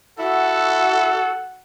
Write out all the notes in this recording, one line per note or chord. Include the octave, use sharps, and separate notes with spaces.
E4 F#4 A4 F#5